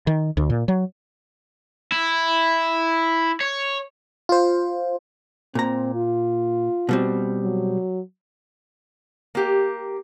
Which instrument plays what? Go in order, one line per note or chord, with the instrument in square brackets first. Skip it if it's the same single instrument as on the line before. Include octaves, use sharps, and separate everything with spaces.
[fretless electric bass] D#3
D2
A#2
F#3
[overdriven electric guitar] E4
C#5
[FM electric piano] F4 C5
[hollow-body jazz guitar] A#2 A#5 [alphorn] C4
[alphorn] F4
[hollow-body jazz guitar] B2 G3 C4
[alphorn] F#3
[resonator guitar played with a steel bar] A#3 G4